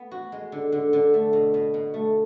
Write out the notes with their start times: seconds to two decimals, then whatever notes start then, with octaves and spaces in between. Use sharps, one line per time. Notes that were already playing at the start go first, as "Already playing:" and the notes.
Already playing: B3
0.11 F#4
0.32 G#3
0.52 D3
0.72 D3
0.93 D3
1.14 A3
1.33 B2
1.54 B2
1.74 B2
1.94 A3